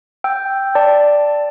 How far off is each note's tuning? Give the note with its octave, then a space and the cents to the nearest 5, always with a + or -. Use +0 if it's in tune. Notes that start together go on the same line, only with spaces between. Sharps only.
G5 +0 E6 +0
D5 +0 A5 +0